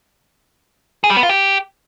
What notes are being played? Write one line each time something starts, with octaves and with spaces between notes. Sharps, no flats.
G#4
G3
B3
F4
G4